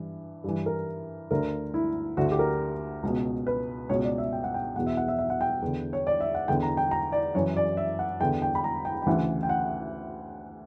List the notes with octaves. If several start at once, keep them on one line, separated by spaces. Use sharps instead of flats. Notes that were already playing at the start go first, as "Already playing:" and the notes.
Already playing: G2 E3
G2 E3
A#4
D2 D3 A#4
E4
D2 D3 F#4
G4
A#4
C#2 B2
B4
C#2 B2 C#5
D5
E5
G5
F#5
G5
E2 B2 F#5
E5
F#5
E5
E5
F#5
G5
E2 D3
C#5
D5
E5
F#5
E2 D3 G5
A#5
G5
A#5
D5
F#2 E3 C#5
D5
E5
F#5
E2 D3 G5
G5
B5
A#5
G5
G5
D2 C#3 E3 F#5
G5
F#5